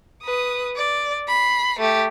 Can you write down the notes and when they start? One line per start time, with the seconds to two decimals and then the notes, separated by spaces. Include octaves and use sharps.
0.24 B4 D#6
0.76 D5
1.28 B5 C7
1.79 A3 G4